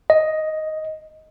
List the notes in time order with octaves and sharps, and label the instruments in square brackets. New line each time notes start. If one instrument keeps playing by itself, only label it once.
[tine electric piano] D#5